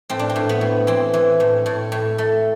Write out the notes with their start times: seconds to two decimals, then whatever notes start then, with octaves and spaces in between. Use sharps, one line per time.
0.10 A2 C4
0.19 D4
0.30 C4
0.36 A2
0.49 B3
0.61 A2
0.87 E3 C4
1.14 E3
1.40 A2
1.66 A2
1.92 A2
2.18 A3